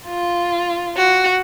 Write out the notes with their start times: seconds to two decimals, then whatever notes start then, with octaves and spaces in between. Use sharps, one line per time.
0.08 F4
0.97 F#4